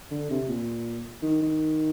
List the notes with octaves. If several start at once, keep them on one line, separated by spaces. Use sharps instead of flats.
D3
C3
A#2
D#3
D#3